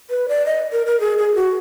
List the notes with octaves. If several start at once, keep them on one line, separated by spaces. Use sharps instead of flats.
B4
D5
D#5
A#4
A#4
G#4
G#4
F#4